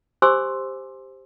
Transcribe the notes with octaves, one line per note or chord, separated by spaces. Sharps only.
G4 C5 G#5 C6 D6 E6